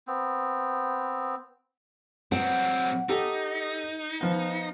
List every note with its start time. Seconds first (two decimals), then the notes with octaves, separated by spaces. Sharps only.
0.07 B3 C4
2.32 F#3 C4 F#5
3.09 D#4 G4 A4
4.21 F3 B3